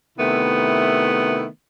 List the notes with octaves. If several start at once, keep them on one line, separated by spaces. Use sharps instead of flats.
C3 D#3 A3 B3 E4